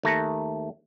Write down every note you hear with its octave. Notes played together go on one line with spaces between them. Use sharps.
D#2 A3 A#5